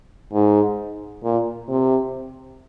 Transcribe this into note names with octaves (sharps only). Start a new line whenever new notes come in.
G#2
A#2
C3